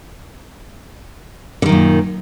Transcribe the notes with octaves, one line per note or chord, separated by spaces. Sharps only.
F#2 A#2 D3 D#3